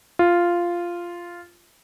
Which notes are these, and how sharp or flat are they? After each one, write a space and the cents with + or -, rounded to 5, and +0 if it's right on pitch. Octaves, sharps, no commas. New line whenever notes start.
F4 -5